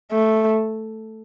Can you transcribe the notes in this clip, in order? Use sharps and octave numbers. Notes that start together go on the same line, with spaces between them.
A3